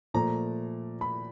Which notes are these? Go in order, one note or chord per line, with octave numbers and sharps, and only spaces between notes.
A#2 F3 A3 A#5
B5